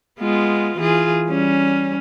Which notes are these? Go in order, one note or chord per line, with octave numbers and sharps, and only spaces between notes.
G#3 B3 F4
E3 F4 G#4
G3 C#4